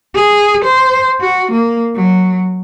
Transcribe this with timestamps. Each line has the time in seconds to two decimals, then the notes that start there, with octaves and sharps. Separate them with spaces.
0.15 G#4
0.64 C5
1.20 F#4
1.52 A#3
1.96 F#3